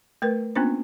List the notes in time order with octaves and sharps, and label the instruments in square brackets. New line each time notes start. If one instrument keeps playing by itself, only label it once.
[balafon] A3 A#4 B4
A#3 B3 C#4 D4 F4 C5